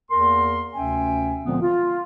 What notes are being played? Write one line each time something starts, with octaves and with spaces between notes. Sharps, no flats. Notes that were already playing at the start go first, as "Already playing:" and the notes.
E2 A#3 A#4 C6
D2 C3 C#4 E5 G5 G#5
A#2 D3 F3 G#3 B3 C4
F4